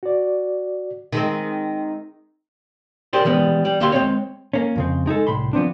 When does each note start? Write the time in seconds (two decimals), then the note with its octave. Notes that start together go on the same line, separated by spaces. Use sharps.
0.03 F#4 D5
1.13 D#3 G#3 C4
3.13 G4 G#4 A#4 C5 D5
3.25 E3 G3 G#3 B3
3.65 G3
3.80 D2 A#3 G4 E5 F5 C6
3.92 G#3 C4 C#5
4.53 A#3 C#4
4.76 F2 C#3 C4
5.06 G#3 D#4 G#4 A4
5.27 C2 A2 C3 B5 C6
5.53 F3 B3 C4 D4